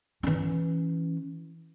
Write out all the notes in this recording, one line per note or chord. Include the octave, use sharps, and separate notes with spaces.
E3 C#4